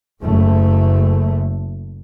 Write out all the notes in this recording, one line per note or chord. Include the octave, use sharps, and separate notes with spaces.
F#1 A3